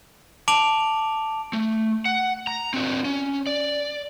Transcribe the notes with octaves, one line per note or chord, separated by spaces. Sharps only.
A5 D6 D7 F7 F#7
A3
F#5
A#5
C4 D4 F#4
C#4
D5